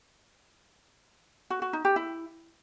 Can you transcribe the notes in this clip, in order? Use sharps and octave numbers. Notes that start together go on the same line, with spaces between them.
F#4
F#4
D#4
G4
E4